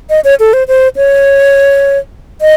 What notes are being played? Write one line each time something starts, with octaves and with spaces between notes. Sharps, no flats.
D#5
C#5
A4
C5
C5
C#5
D#5